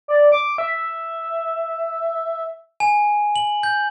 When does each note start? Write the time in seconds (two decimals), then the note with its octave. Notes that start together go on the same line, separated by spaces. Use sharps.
0.08 D5
0.32 D6
0.58 E5
2.80 G#5
3.36 F#7
3.63 G6